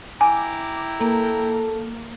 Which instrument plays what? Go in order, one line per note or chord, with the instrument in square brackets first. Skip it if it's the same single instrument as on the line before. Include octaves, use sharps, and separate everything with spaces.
[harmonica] E4 G5 A#5 [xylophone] G#5 [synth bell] D6
[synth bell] A#3 [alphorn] A4